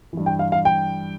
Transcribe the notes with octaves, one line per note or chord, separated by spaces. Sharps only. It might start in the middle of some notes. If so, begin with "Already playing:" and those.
G2 E3
G5
F5
F5
G5